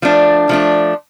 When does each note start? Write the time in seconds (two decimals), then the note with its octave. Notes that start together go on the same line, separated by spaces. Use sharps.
0.02 F3 A3 D4
0.49 F3 A3 D4